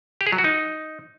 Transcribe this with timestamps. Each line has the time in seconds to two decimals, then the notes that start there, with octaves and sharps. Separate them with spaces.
0.21 G4
0.27 G#4
0.32 F#3
0.38 F#4
0.44 D#4